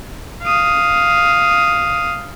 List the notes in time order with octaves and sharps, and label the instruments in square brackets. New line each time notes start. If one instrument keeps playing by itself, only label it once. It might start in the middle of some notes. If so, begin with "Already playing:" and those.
[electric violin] F5 D#6